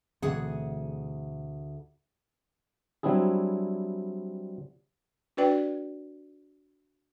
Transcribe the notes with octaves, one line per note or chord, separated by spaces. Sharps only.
D2 B2 E3 C4 G#4 F#5
F#3 G3 C4 D4 E4 G#4
D4 F#4 B4 D5 G5